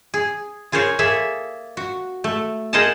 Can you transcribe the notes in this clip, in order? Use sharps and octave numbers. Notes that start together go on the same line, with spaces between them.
G#4
F4 G#4 A#4 C5 C#5
A#3 G#4 A4 E5
F#4
A3
G#4 A#4 C5 D#5 F#5 A5